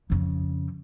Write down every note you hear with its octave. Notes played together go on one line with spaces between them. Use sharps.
F2 C#3